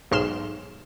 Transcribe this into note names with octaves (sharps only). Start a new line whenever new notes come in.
B1 G#2 G#3 C6 F6 E7